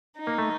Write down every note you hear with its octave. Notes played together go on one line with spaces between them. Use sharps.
D#4
A#3
A3